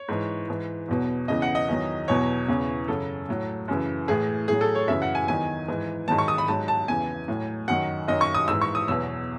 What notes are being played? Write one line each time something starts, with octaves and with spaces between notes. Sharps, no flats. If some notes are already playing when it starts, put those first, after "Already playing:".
Already playing: C#5
G#2 E3
G#2 E3
E2 B2 F#3
E2 C#3 E3 D#5
F#5
D#5
E2 D#3 F#3
E2 B2 F#3 C#5
E2 C#3 E3
F#2 C#3 F#3 A4
A2 F#3
F#2 C#3 E3
A2 E3 G#4
A2 F#3 G#4
A4
C#5
F#2 C#3 E3 E5
F#5
G#5
E2 D#3 F#3 G#5
G#2 E3
G#2 D#3 F#3 A5
C#6
D#6
B5
G#2 F#3 A5
A5
E2 C#3 E3 G#5
A2 F#3
F#2 D#3 F#3 F#5
F#2 D#3 F#3 D#5
C#6
D#6
G#2 E3 E6
C#6
D#6
E2 B2 F#3 E6